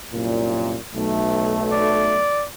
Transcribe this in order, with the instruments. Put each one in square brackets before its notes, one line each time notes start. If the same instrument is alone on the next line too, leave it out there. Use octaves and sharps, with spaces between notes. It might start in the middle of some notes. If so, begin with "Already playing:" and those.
[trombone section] C2 F#2 A#2
B1 A3
[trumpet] D5